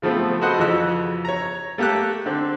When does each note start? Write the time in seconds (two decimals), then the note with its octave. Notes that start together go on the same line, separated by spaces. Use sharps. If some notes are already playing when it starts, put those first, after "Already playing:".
0.02 C#3 F3 A3 B3 C4
0.41 F#4 A4 B4 C5 D#5 F#5
0.58 F2 C#3 E3 F#4 E6 F#6
1.25 C#5 A#5
1.78 A3 A#3 G4 A4 F#6
2.26 D3 C4